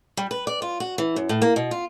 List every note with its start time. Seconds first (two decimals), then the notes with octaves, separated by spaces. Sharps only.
0.17 G3
0.31 B4
0.47 D5
0.62 F4
0.80 F#4
0.98 E3
1.16 F#2
1.29 A2
1.42 A#3
1.56 B2
1.71 F4